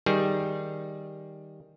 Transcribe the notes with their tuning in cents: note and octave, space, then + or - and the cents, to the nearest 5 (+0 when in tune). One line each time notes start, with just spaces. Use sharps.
D#3 +0 G3 -5 G#4 +0